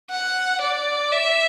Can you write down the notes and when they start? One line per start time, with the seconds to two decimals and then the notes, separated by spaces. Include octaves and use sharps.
0.10 F#5
0.61 D5
1.11 E5